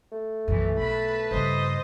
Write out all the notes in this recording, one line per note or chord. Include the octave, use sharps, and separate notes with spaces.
A3
B1 F#2 E3
B2 B4 A5 B5
G2 C#3 C5 D#5